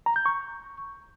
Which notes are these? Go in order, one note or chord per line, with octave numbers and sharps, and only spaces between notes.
A#5
G6
C#6